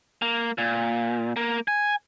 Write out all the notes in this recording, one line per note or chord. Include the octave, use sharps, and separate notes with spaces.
A#3
A#2
A#3
G#5